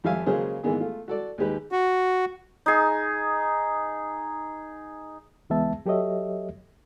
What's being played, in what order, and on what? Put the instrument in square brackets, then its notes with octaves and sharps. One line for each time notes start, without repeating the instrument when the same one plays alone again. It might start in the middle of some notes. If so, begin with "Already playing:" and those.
[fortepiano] F2 F3 G4 E5 F5 G#5
C#3 F#3 G#3 A#3 G#4 C5
G#2 E3 G#3 A#3 B3 G#4
A3 F4
F#4 A4 D5
D#2 G#3 G4 B4
[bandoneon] F#4
[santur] D#4 G#4
[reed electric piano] C#2 E3 G#3 B3 E5 A5
F#3 G4 A4 C#5 D#5 E5